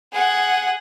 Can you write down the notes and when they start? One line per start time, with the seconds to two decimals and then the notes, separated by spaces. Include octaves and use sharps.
0.13 G#4 F#5